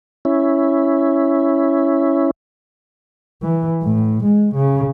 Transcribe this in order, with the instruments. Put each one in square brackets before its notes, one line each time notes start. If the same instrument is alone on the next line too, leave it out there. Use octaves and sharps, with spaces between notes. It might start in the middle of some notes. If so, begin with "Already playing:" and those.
[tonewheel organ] C#4 E4
[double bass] E3
A2
G#3
C#3